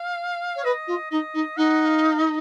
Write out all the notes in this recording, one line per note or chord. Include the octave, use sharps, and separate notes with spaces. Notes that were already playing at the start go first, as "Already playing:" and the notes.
Already playing: F5
C#5
B4 D#5
F4
D#4 D#5
D#4
D#4 F#5
F5
D#5